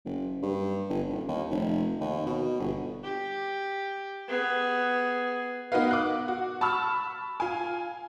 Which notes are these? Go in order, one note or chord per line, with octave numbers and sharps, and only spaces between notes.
F#1
G2
G1
D#1
D#2
F1
D#2
B2
G1
G4
B3 G#4
B3 D#4 F#4 A#4 B4 F5
D6 F#6
F#4
A5 B5 C#6 E6 F6
F4 G#5